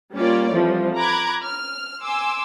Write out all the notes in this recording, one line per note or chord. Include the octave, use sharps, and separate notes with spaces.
G3 A#3 C#4 F4 C#5 D5
F2 E3 F3 G3
A#5 B5 D6 F#6 G#6
F6
G#5 C6 D6 E6